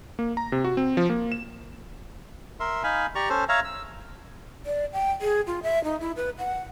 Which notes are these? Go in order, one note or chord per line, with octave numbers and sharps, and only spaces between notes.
A#3
A#5
C3
F#4
C4
F3
A#3
E7
A#4 E5 C6
D#4 F5 G#5 B5
G4 D5 A#5 C#6
C#4 A4 C5
C#5 E5 F5 A#5
E6
D5
G5
G#4
F4
E5
D#4
E4
B4
F#5